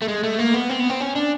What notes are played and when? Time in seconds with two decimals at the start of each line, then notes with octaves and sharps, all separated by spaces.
0.02 A3
0.08 G#3
0.23 A3
0.39 A#3
0.54 B3
0.69 C4
0.80 B3
0.90 C4
1.00 C#4
1.16 D4